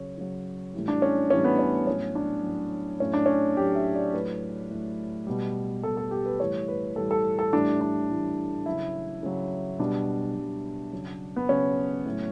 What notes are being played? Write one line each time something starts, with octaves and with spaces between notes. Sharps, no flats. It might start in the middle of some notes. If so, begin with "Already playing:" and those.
Already playing: C#3 F#3 C#5
C#3 F#3
A2 E3 G3
D4
C#4
A2 E3 G3 C#4
B3
C#4
A2 F#3 C#4
D4
A2 F#3
A2 F#3 C#4
D4
C#4
A2 F#3 G4
E5
D5
A2 F#3 B4
A2 F#3
B2 G3
B2 G3 A4
A4
G4
B4
A2 E3 G3 C#5
B4
A2 E3 G3 A4
A4
A4
A2 E3 G3 D4
D4
A2 E3 G3
C#3 F#3 E4
C#3 F#3
B2 G3 D4
B2 G3
C#3 F#3
B3
C#3 F#3 C#4
A2 F#3